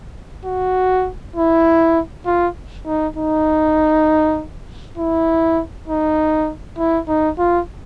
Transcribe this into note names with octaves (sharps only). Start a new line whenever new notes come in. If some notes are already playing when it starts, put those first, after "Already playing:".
F#4
E4
F4
D#4
D#4
E4
D#4
E4
D#4
F4